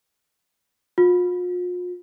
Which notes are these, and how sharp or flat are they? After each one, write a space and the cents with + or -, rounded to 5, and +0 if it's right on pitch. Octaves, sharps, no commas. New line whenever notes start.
F4 +40